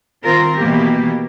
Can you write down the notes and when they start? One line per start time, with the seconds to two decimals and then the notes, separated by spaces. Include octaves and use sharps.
0.23 D#3 C4 F4 A#4
0.57 B2 E3 A#3 G4